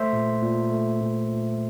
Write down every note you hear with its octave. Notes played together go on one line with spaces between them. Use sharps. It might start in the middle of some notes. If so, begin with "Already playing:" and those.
Already playing: A3 C5 E5
A#2
A#2
A3
A#2
A#2